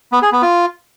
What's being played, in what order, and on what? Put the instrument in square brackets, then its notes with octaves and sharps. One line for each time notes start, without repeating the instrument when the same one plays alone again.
[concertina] B3
G#4
B3
F4